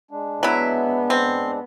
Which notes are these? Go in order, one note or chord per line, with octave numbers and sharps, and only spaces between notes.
G#3 D4
F#3 B3 E4
C4